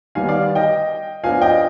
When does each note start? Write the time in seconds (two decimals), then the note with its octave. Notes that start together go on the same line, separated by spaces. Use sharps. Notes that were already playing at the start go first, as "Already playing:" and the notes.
0.15 D#3 G3 B3 F5 G#5
0.28 D5 F5
0.55 D#5 G5
1.24 F3 B3 D4 F5 G#5
1.41 D#5 G5